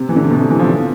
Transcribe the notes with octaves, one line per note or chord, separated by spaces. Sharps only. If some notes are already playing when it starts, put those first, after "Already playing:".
Already playing: C3
E3
D3
C3
B2
C3
E3
F3
D3